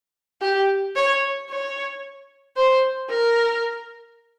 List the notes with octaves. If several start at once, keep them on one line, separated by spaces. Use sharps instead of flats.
G4
C#5
C#5
C5
A#4